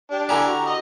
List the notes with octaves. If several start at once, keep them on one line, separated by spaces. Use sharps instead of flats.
D4 G4
D3 E4 G4 G#5 A#5
F#4
D#5